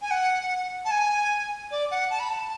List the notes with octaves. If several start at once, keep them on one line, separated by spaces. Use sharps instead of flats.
G#5
F#5
A5
G#5
D5
F#5
A5
B5
A5